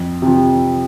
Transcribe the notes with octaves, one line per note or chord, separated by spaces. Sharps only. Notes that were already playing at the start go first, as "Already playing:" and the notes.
Already playing: F2
C3 F3